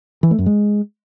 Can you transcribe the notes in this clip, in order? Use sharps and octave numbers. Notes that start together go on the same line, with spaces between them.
E3
A3
F#2
G#3